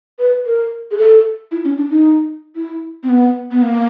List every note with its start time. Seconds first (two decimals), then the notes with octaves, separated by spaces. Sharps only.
0.19 B4
0.46 A#4
0.91 G#4
0.98 A4
1.51 E4
1.65 C#4
1.77 D4
1.90 D#4
2.56 E4
3.03 C4
3.09 B3
3.51 B3
3.62 A#3